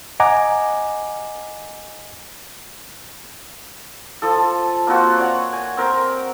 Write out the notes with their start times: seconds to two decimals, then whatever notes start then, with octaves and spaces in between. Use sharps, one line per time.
0.20 D#5 F#5 G#5 A#5 D6
4.22 F3 A4
4.87 A#3 C4 F4 F#4
5.17 C#5 D5 F#5
5.53 G#5
5.77 C4 A#4